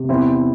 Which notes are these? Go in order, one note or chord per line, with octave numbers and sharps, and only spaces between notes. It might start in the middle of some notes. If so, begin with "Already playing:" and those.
Already playing: C3
E2 C4 E4